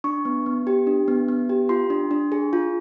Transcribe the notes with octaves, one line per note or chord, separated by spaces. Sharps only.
D4 C#6
B3
B3
G4
D4
B3
B3
G4
F4 C6
D4
D4
G#4
F4